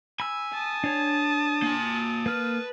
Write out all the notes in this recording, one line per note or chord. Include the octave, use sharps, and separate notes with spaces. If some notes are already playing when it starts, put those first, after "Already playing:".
G#5 B5 E6
A5 D#6
D4 C#5
A#3 G#5
A#3 B4 F6